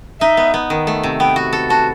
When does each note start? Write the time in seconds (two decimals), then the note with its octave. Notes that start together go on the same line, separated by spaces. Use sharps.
0.20 D#4 E5
0.37 B3
0.54 B3
0.70 D#3
0.87 A3
1.03 C3
1.20 B3 G5
1.36 F#4
1.53 A4
1.70 F#4 A5